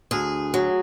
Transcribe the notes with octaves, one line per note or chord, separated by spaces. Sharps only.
D2 G#4
F#3